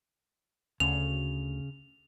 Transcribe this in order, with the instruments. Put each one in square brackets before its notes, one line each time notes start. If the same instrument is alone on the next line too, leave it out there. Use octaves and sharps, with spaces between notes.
[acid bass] D2 [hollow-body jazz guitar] C#3 [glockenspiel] F7